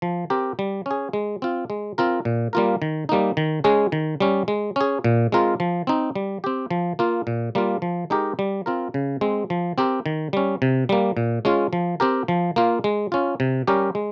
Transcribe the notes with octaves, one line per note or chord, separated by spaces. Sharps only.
F3
C4 G4 A#4
G3
C#4 G#4
G#3
C4 F4
G#3
C4 F4 A#4
A#2
G3 A#3 F4 A#4
D#3
G3 A#3 D#4
D#3
G#3 C#4 G#4
D#3
G3 C#4
G#3
C#4 G#4
A#2
G#3 C4 F4 A#4
F3
C4 D#4
G3
C4 G4
F3
A#3 F4
A#2
G3 A#3 F4
F3
G#3 D#4 G4 A#4
G3
C4 F4 A#4
C#3
G#3 C4
F3
C4 G4 A#4
D#3
G3 C#4
C3
G3 A#3
A#2
G#3 C#4 F4
F3
C4 G4 A#4
F3
A#3 F4
G#3
C#4 F4
C3
G3 C#4 G4 A#4
G#3